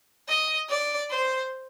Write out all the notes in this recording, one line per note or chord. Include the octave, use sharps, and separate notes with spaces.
D#5
D5
C5